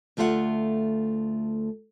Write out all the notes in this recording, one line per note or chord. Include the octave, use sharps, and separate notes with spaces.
D2 A3 F4 E5 F#5